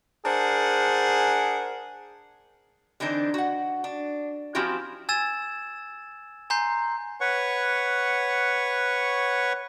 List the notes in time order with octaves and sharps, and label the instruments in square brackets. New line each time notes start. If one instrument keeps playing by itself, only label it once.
[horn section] D4 G#4 A#4 C5 F#5
[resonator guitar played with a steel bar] D3 E3 C4 D4 D#4
F#4 F#5
D4
F3 C4 C#4 E4 F#4 G4
[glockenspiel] G#5 E6 G#6 A6 E7
G#5 A#5 C6 G6 C7
[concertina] B4 C#5 F#5 C#6